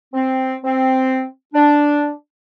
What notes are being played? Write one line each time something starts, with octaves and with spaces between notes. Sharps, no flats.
C4
C4
D4